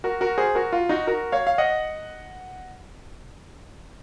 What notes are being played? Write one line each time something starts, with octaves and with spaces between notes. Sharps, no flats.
F#4 A#4
F#4 A#4
G#4 C5
F#4 A#4
F4
D#4 F#4
F#4 A#4
C#5 F5
F5
D#5 F#5